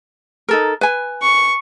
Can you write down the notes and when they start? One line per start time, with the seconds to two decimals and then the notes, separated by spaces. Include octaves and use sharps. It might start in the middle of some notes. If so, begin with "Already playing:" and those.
0.49 D#4 A4 A#4
0.81 B4 G#5
1.22 C#6